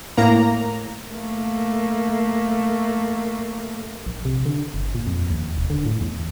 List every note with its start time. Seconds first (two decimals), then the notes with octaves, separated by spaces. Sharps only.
0.17 A2 A#3 A#5
1.10 A3 A#3
4.06 A#1
4.25 C3
4.46 D3
4.74 G1
4.95 A#2
5.07 F2
5.31 D#2
5.58 E1
5.70 D3
5.86 A2
6.01 E2